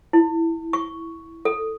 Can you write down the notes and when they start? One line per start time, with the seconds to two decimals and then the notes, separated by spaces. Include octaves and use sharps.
0.13 E4
0.73 C#6
1.45 A4